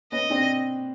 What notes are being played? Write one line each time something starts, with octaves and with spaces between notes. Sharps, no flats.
B3 C#4 D#5
C4 D4